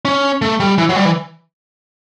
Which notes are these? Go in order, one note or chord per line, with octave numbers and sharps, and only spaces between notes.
C#4
A3
G3
E3
F#3
G3
E3